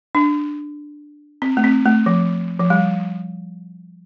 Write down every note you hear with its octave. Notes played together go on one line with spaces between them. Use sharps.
D4
C4
A3
C4
A3
F3
F3
G3